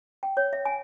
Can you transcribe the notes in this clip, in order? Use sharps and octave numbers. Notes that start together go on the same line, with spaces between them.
G5
C#5
E5
G#5